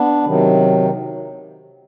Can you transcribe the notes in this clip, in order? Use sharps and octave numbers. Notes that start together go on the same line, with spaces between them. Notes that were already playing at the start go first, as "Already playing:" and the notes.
Already playing: B3 D4
C3 D#3 F#3